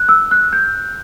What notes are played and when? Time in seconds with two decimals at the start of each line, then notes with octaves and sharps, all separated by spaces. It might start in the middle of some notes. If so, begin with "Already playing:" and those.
Already playing: F#6
0.09 E6
0.31 F#6
0.53 G6